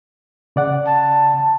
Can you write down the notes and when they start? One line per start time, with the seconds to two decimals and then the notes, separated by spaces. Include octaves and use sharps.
0.56 C#3 D5 F#5
0.87 A5